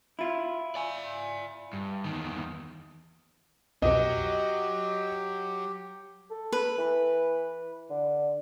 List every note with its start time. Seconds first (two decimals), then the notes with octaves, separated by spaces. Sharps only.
0.19 E4 F4
0.75 D5 G#5
1.73 G2
2.05 E2 D#3
3.82 C2 F2 B2 F#3 G4 D#5
6.31 A4
6.52 B4
6.78 E3
7.90 D3